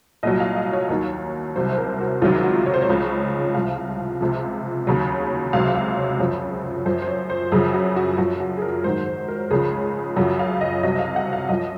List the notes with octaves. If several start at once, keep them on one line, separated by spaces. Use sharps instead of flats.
C2 A#2 F#3 D#5
F5
D#5
C#5
D#2 D#3 F#3
C2 C3 F#3 C5
C5
A#4
F#4
C#2 C3 D#3 F#3 F4
F#4
C#5
C5
C#5
C#2 C#3 F3
C2 C3 F3 F5
C#2 C3 F3
D#2 C#3 F#3
C#2 C3 F#3 F5
F5
C#5
F#2 C#3 F3 C5
F#2 F3 C5
C5
C#5
C5
F#2 C#3 F3 G#4
F#4
F#4
F#2 F3 F#4
F#4
G#4
A#4
G#2 D#3 F#3 C5
C5
A#4
C#2 C#3 F3 G#4
F#2 C#3 F3 F#4
F5
D#5
C2 C3 F#3 D#5
F5
F#5
F5
F#2 F3 D#5